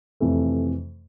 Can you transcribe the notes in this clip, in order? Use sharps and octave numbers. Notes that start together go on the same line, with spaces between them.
F2 C3 E3 A3